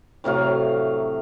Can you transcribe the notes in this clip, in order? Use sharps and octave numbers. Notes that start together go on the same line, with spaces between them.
A2 C3 F#3 F5